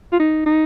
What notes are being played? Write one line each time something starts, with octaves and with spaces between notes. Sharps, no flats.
F4
D#4
D#4